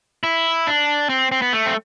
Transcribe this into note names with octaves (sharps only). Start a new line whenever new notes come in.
E4
D4
C4
C4
B3
A3
C4